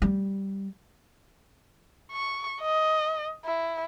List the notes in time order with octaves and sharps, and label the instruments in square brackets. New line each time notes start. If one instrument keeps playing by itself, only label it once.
[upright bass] G3
[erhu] C#6
D#5
E4